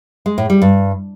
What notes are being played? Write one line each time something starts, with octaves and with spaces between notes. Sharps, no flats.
G#3
A2
G3
G2